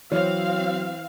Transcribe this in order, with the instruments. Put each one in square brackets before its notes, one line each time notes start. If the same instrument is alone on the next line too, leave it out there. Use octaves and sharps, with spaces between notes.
[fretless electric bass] E3 [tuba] F#3 [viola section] C4 F5 [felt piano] C#5